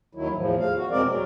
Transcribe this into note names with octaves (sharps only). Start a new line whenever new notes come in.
D#2 D#3 F#3 E4
E2 A2 F3
F5
F#4
E2 B2 G#3 C4 A#4 D5
F#3